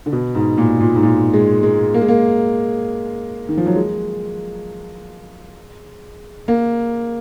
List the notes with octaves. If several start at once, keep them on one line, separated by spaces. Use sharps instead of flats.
D3
B2
G#2
A#2
A#2
G#2
A#2
G#3
G#3
A#3
G#3
A#3
D#3
F3
F#3
G#3
A#3